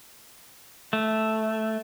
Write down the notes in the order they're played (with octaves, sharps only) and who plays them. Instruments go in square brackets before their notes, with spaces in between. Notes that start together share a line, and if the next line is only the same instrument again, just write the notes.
[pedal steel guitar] A3